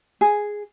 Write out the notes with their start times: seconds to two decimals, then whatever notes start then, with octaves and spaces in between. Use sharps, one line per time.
0.21 G#4